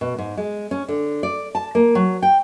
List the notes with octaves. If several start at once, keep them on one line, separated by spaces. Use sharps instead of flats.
B2
G#2
G#3
C#4
D3
D5
A5
A#3
F#3
G5